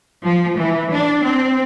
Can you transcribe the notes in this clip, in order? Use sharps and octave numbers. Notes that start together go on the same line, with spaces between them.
F3
E3
D4
C4